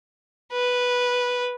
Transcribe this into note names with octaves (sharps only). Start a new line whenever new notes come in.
B4